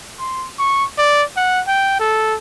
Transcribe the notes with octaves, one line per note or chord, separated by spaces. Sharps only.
C6
C#6
D5
F#5
G5
A4